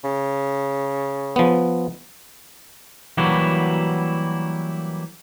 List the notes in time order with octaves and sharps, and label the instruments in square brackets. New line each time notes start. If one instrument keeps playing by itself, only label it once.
[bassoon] C#3
[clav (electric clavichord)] F3 B3
[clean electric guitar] E3 F#3 G3 A#3 E4 F#4